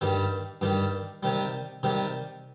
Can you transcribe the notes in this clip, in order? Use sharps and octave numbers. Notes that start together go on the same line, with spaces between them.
G2 D#3 G3
G2 D#3 G3
C3 D#3 G3
C3 D#3 G3